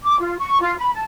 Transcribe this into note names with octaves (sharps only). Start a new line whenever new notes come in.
D6
F4
C#6
F4
B5
A5